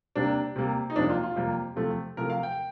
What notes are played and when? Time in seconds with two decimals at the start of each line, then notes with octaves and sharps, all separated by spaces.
0.15 C3 G3 A#3 D4
0.56 C3 G3 A#3
0.90 D#4
0.96 F2 C3 G3 A#3 D4
1.09 F4
1.23 F4
1.36 F2 C3 G3 A#3
1.76 C3 F3 A3
2.17 C3 F3 A3 A#4
2.30 F5
2.43 G5